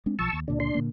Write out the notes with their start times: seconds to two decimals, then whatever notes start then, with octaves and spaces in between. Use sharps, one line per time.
0.06 G#3 C4 D4
0.19 B1 F3 A5 C#6 E6
0.33 D#2
0.48 C#2 A#2 D3 D4
0.60 D4 C6
0.75 A#2 D3 A#3